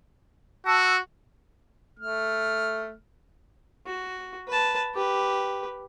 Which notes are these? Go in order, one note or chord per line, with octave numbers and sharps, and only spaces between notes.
F#4 A5 E6
A3 F6
F#4
B4 A5
G4 B4